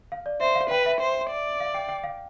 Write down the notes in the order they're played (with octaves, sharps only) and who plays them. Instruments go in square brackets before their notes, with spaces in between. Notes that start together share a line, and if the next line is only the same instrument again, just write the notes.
[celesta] F5
D5
[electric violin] C5 [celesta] E5
[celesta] F5
[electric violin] B4 [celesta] G5
[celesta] E5
[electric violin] C5
D5
[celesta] F5
G5
G5
F5